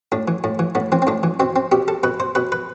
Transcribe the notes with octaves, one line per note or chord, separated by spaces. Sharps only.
A2 D4
E3
A2
E3
A2 B3
E3 C4
C4
A2 D4
E3
B2 C4
C4
B2 G4
A4
B2 B4
C5
B2 B4
B4